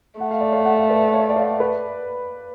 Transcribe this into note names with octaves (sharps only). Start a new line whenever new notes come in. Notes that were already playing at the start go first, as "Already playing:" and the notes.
A3 F#5
F5
D5
C#5 F5
F#5
F5
B4 D5
C#5 F5
D5
C#5 F5
B4 D5